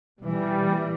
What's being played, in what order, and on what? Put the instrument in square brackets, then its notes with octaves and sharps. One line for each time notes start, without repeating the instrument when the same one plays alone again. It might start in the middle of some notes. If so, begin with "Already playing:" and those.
[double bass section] B2 E3 [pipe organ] G3
[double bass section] A#2 E3